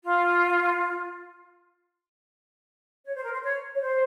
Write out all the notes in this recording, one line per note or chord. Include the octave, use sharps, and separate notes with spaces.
F4
C#5
C5
A#4
C5
C#5
C#5
C5